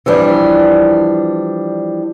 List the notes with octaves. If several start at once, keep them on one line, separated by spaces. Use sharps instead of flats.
E3 F3 G3 D4